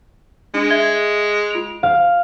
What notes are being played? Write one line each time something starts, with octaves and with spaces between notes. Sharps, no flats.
G#3 D4
E5 G#6 G7
F4 D7 F7
F5